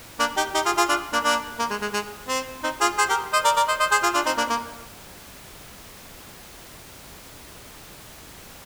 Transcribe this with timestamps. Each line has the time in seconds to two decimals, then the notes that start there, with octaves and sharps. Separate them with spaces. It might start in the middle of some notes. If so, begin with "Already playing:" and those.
0.19 A#3 D4
0.37 D#4 G4
0.54 D#4 G4
0.66 F4 G#4
0.78 F4 G#4
0.89 D4 F4
1.13 A#3 D4
1.24 A#3 D4
1.59 A#3
1.71 G#3
1.82 G#3
1.93 G#3
2.28 C4
2.64 C4 D#4
2.81 F4 G#4
2.98 G#4 C5
3.09 G4 A#4
3.33 C5 D#5
3.45 A#4 D5
3.57 A#4 D5
3.68 C5 D#5
3.80 C5 D#5
3.91 G#4 C5
4.03 F4 G#4
4.14 D4 F4
4.26 C4 D#4
4.37 A#3 D4
4.50 A#3